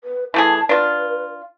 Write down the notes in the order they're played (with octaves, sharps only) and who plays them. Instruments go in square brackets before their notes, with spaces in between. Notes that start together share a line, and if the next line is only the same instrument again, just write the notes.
[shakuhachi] B4
[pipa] E3 A3 G#4 [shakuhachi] A5
[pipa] D4 F4 [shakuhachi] B4